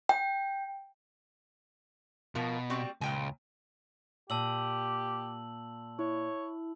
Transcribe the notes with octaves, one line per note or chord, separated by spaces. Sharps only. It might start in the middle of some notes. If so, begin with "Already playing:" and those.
G5
B2 F3 A#4
G3 C4 F#4
C#2 A#2 G5 G#5
A#2 G4 A5 E6 F#7
E4 C#5